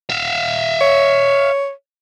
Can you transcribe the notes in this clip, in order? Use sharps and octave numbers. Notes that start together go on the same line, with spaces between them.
E5 F5
C#5